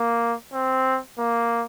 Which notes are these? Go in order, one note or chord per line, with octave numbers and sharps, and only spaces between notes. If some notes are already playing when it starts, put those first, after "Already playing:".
Already playing: A#3
C4
A#3